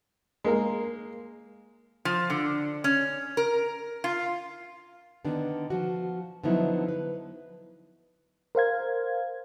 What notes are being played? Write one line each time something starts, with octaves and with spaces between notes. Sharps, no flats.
G#3 A#3 A#4
F3
D3
C#4
A#4
F4
D3 D#3 B3 D4
F3 F#4
D3 F3 F#3 B3 D#4 E4
B4
A#4 C5 F5 G#6